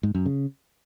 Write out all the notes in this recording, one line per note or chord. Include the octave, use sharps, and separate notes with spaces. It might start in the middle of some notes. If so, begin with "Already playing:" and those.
G#2
F#2
C#3